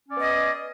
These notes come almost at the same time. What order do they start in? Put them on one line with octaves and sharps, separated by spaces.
C#4 D5 B3 D#5 G#4